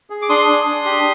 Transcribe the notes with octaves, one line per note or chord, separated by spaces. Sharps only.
G#4
D6
D4 C6 D#6
D4
D4
G4